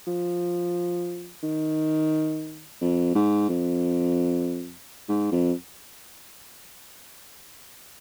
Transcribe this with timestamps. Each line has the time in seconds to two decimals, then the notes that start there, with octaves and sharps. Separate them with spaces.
0.07 F3
1.43 D#3
2.81 F2
3.15 G#2
3.49 F2
5.09 G#2
5.32 F2